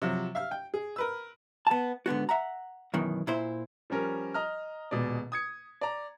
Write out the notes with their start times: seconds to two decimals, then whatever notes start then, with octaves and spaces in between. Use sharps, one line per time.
0.02 C3 F3 F#3
0.35 E5 F5 F6
0.51 G5
0.74 G#4
0.96 A#4 B4 E6
1.67 B3 A5
2.06 G#2 D3 B3 F#4
2.29 E5 F#5 A#5
2.94 F#2 B2 D#3 E3
3.27 A#2 E4 C5
3.90 F3 G3 C#4 A#4
4.34 D#5 A#5 F6
4.91 D#1 B2 G#3 D5
5.32 D#6 G#6 C#7
5.81 D5 A#5